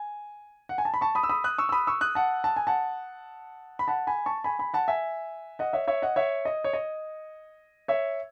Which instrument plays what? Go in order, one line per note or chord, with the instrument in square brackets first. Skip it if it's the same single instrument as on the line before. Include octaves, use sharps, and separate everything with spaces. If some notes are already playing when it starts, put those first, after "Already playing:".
Already playing: [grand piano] G#5
F#5
G#5
A5
B5
A5 C#6
B5 D#6
E6
B5 D#6
D#6 F#6
C#6 E6
E6
B5 D#6
C#6 E6
D#6 F#6
F#5 A5
A5
G#5
F#5 A5
B5
F#5 A5
G#5 B5
A5 C#6
G#5 B5
G#5 B5
F#5 A5
E5 G#5
D#5 F#5
C#5 E5
C#5 E5
D#5 F#5
C#5 E5
D#5
C#5
D#5
C#5 E5